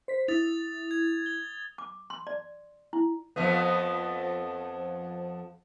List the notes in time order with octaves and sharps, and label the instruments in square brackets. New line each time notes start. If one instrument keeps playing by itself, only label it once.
[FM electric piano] C5 B6
[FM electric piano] E4 [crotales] D#6 A6 F7
[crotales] G#6
G7
[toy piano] D6
C6
D5
E4
[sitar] F2 F3 B3